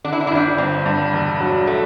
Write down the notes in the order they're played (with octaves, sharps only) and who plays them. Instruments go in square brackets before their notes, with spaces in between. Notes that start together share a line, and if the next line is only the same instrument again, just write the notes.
[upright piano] D3 [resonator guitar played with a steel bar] D4
[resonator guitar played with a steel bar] E4
D4
E4
[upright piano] G1 [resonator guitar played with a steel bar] D4
[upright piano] G2 [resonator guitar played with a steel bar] C4
[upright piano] G2
E1
F#3
[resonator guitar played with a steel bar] A3